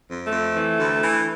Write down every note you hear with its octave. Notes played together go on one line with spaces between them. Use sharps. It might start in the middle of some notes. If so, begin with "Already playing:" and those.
F2
A3
F2
E3
D2
E3